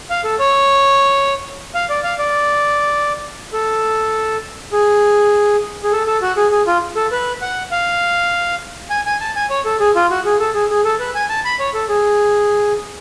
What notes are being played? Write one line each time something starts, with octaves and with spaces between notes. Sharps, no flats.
F5
A4
C#5
F5
D5
F5
D5
A4
G#4
G#4
A4
A4
F#4
G#4
G#4
F4
A4
B4
F#5
F5
G#5
G#5
A5
G#5
C#5
A4
G#4
F4
F#4
G#4
A4
G#4
G#4
A4
B4
G#5
A5
B5
C#5
A4
G#4